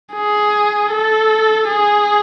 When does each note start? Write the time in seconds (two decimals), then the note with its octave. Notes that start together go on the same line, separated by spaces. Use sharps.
0.13 G#4
0.92 A4
1.68 G#4